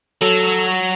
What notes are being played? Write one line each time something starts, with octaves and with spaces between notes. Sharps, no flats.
F#3 A4